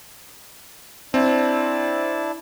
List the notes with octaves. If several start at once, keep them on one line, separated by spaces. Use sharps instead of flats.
C4 D4 E4 A5